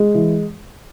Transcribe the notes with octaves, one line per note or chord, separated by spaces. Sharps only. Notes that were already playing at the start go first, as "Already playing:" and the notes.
Already playing: G#3
E3